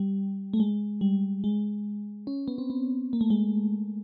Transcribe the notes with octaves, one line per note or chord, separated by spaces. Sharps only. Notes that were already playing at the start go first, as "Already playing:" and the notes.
Already playing: G3
A3
G#3
G3
G#3
C#4
B3
C4
B3
A#3
A3
G#3